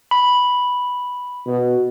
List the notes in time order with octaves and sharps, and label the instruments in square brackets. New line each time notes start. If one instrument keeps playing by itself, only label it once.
[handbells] B5
[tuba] B2